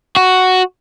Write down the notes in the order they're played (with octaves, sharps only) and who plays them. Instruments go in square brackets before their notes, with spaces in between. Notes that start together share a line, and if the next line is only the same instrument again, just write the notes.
[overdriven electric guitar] F#4